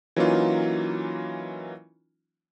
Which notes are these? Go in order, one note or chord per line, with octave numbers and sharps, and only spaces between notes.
E3 F#3 A#3 C#4 D#4 F4